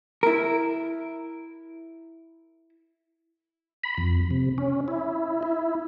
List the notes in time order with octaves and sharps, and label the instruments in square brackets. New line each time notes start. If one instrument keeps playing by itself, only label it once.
[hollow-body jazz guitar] E4 A#4
[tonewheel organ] B5
F2
C3
C#4
E4
E4